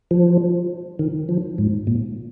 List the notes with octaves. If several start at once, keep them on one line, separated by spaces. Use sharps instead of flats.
F3
D#3
F3
G#2
A#2